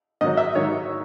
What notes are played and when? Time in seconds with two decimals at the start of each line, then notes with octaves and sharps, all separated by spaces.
0.21 G#2 D#3 F#3 D#5
0.37 E5
0.55 G#2 D#3 F#3 C#5